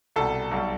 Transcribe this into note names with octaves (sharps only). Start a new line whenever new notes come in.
C2 B2 G3 A4
B1 B2 G3